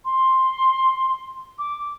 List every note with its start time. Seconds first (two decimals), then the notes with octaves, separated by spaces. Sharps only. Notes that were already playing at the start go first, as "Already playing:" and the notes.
0.05 C6
1.58 D6